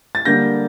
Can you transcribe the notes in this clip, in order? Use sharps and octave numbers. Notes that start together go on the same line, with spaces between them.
A6
D3 G3 A#3 G6 A#6